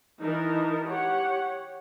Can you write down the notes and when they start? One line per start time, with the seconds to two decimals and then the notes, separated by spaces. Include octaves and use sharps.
0.20 E3 D#4 A#4 A5
0.86 G4 C#5 F#5